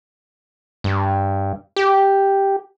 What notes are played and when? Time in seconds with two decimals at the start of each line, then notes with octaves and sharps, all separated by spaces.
0.84 G2
1.76 G4